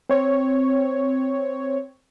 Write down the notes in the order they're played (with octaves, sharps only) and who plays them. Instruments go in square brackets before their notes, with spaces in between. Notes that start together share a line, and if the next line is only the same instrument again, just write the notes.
[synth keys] C4 C#5